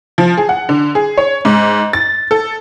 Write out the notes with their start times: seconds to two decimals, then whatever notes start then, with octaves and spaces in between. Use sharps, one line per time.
0.18 F3
0.38 G#4
0.49 F#5
0.69 D3
0.95 G#4
1.18 C#5
1.45 G#2
1.93 A6
2.31 A4